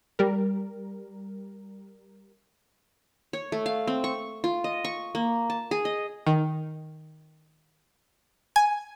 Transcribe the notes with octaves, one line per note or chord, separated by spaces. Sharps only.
G3 A#4
C#5
A3
F5
C4
C#6
F4
D#5
C#6
A#3
A5
G#4
D#5
D#3
G#5